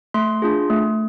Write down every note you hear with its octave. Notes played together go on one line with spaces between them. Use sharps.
A3 C6
D4 F4 G#4
A3